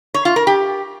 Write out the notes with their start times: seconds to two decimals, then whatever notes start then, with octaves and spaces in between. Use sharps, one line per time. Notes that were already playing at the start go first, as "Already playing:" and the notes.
0.14 C#5
0.25 F4
0.36 A#4
0.47 G4